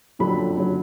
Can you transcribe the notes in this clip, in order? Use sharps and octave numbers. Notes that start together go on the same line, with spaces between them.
F#1 F2 D3 F#3 B5
F#1 D3 F#3